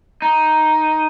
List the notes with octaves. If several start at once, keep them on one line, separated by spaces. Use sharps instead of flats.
D#4